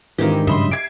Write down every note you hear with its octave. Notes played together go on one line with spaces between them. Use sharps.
G#2 D#3 E3 G#3 C4 D4 F4 G4
G2 C#3 F#3 D#5 E5 B5 C6
G#6 C7 D7